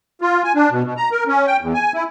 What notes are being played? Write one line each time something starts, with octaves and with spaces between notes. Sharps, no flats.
F4
G#5
D4
B2
B2
A#5
A#4
C#4
G5
E2
G#5
E4